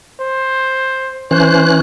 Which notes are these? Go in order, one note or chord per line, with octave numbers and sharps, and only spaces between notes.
C5
E3 C#4 C5 F#6